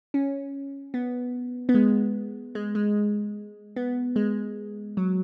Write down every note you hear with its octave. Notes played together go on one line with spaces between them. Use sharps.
C#4
B3
B3
G#3
G#3
G#3
B3
G#3
F#3